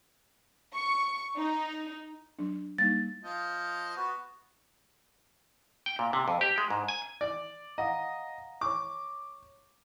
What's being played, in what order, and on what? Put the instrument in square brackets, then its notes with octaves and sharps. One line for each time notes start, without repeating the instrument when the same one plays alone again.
[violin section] C#6
D#4
[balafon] F#3 D4
[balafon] G3 A#3 D#4 [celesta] A6
[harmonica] F3 D#5 F5
B3 F#4
[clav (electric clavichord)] G5
A#2
C3
F2
G4
G#3
G#2
G#5
[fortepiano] D5
[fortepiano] D#5 [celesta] F5 F#5 A#5
[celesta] C#5 C#6 [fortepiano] D6